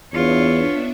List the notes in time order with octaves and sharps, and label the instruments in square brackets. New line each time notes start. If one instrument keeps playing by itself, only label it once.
[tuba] E2 [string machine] B3 D4 E5 [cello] F4 C#5